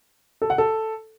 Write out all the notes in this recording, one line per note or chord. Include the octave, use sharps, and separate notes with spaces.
A4
F#5
A4